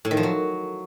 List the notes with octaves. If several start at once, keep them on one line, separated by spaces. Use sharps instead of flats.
A2
D#3
F3
F#3